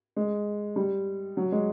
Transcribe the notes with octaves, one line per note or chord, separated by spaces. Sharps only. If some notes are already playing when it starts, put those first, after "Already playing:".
G#3
G3
F#3
G#3